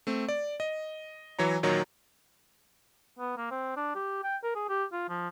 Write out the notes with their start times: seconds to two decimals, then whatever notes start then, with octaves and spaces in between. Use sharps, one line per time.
0.07 A3 C4
0.29 D5
0.60 D#5
1.39 E3 F#3 C#5 A#5
1.63 A#2 D#3 F#3 C#5 A#5
3.19 B3
3.37 A#3
3.51 C4
3.77 D4
3.95 G4
4.23 G5
4.44 A#4
4.55 G#4
4.69 G4
4.92 F4
5.09 F3